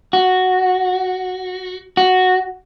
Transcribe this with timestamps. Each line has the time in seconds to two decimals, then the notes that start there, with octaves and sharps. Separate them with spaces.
0.13 F#4
1.97 F#4